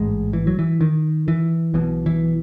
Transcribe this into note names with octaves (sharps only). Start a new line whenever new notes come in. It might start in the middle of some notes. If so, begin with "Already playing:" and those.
Already playing: A1 G#2 G#3
E3
F#3
E3
D#3
E3
B1 B2 E3
E3